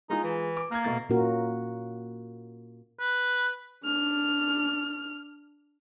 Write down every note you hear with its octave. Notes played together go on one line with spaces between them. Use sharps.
G#3 D#4 F4 G#4
E3
D6
A#3 F6 G#6
B2 A3 A6
A#2 A#3 C#4 F4 F#4 A#4
B4
D4 F6